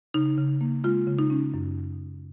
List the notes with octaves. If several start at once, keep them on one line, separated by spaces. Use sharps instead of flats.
C#3 D#4
C#3
A#3
G#3 F4
C#3
D#4
C#4
F#2